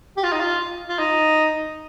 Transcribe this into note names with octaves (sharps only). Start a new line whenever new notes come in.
G4
F4
D#4
F4
F4
D#4